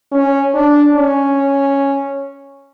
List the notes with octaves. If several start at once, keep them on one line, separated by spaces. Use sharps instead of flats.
C#4
D4
C#4